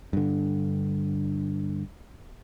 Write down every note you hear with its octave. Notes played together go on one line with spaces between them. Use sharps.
G2 D3